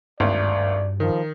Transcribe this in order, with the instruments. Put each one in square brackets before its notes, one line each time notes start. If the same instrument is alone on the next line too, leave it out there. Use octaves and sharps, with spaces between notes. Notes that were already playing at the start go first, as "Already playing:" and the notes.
[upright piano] G#1 D2 [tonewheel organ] G2 [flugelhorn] D5
[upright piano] D#3 [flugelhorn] F3